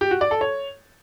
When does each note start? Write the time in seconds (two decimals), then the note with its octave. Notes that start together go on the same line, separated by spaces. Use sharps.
0.01 G4
0.11 F#4
0.21 D5
0.31 A4
0.41 C#5